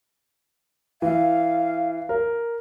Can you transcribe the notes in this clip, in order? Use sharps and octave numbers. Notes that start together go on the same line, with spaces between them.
E3 F5
A#4